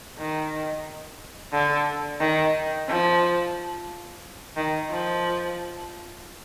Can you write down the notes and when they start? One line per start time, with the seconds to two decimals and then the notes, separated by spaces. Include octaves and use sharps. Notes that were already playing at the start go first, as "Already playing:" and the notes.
0.18 D#3
1.52 D3
2.20 D#3
2.88 F3
4.56 D#3
4.90 F3